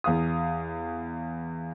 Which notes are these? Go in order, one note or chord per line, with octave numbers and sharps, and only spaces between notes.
E2 F5 D#6